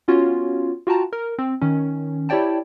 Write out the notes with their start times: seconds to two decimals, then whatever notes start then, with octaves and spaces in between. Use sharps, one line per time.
0.08 B3 C#4 F4 F#4 C#5
0.87 F4 F#4 G5 A5 A#5
1.13 A#4
1.38 C4
1.62 D#3 C#4
2.29 E4 G4 C#5 D5 G5 A5